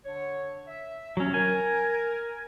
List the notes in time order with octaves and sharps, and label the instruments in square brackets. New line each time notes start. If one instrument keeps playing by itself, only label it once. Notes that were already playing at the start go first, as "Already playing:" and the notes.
[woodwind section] D3 D4 C#5
E5
[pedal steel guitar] F#3 C#4
[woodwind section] A#4 [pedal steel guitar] G#5